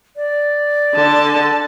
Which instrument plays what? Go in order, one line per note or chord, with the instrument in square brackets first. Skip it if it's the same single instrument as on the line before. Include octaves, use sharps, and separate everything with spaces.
[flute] D5
[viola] D3 A5